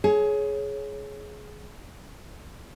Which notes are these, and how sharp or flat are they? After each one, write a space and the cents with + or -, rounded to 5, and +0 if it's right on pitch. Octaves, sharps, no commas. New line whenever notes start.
G#4 +20 C#5 +0